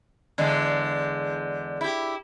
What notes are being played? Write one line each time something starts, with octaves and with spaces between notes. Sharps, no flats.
E2 D3 G#3
E4 G4